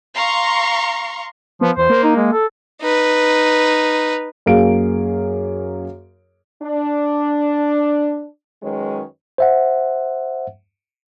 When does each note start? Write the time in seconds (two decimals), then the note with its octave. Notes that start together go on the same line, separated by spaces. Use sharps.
0.14 F5 A#5 C6 C#6
1.61 F3 B3
1.77 E2 C5
1.90 A#3
2.03 D#4
2.16 G#3
2.32 A4
2.81 D#4 B4
4.46 F#2 A#3 G#4 F5 D7
6.63 D4
8.63 F#2 D#3 G#3 C#4 B4 C#5
9.38 C5 E5 F#5